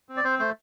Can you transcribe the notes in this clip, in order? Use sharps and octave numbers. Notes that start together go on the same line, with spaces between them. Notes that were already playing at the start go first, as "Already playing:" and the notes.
C4
D5
C4 C5
A3 C5